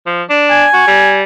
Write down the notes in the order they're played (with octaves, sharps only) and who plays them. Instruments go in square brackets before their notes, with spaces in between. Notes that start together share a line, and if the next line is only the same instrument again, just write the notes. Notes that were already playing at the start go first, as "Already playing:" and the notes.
[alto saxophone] F3
D4
[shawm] G#5
[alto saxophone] F#4
G3